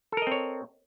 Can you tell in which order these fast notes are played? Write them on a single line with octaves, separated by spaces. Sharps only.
A4 A#4 D#5 C4 C#5